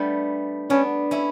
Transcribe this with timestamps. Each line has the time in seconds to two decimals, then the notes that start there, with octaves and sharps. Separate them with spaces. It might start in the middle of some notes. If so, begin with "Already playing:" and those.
Already playing: G3 A3 B3 D4
0.70 B3 C#4 D4
1.11 C#4 E4